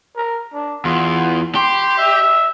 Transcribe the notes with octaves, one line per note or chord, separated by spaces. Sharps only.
A#4
D4
E2 F4
G4 C6
E5